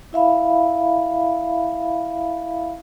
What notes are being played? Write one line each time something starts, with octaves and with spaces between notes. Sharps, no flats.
E4 E5 F5 B5